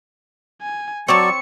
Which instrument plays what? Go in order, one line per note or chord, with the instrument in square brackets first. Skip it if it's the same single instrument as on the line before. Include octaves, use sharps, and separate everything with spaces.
[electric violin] G#5
[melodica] F#3 D5 [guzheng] C4 C#5 A5 [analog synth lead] C#6 [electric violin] C#7